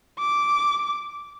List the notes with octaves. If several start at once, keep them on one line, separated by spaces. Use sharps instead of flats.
D6